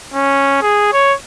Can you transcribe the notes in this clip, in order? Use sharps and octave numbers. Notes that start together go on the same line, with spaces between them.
C#4
G#4
C#5